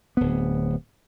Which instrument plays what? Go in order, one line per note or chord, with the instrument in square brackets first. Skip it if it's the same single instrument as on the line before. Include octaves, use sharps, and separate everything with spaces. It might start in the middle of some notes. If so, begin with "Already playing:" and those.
[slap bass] D1 B3